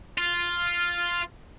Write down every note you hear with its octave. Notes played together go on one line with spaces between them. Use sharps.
F4